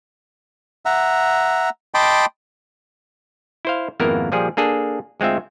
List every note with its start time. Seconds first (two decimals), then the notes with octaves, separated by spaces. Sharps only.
0.85 E5 F#5 A#5
1.94 D#5 G5 A5 B5 C6 D6
3.65 E4 C5 F5
4.00 G#1 F2 A#3 B3 E4 A#4
4.32 A#2 F3 G3 G#4
4.57 A#3 D4 G#4 A4
5.20 D2 G#3 C4 F4 E5